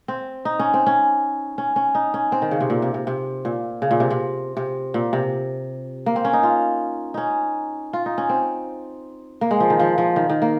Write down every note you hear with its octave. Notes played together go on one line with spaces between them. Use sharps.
C4
D#4
C#4
C4
C#4
C#4
C#4
D#4
C#4
C4
D#3
C#3
C3
A#2
C3
C3
C3
A#2
C#3
A#2
C3
C3
C3
A#2
C3
A#3
C4
C#4
D#4
F4
C#4 D#4
F4
D#4
C#4
C4
A#3
G#3
F3
D#3
F3
F3
D#3
D#3
A#3